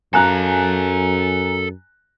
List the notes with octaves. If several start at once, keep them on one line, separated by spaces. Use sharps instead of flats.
F#2 A4 F5 G#5 A#5 F#6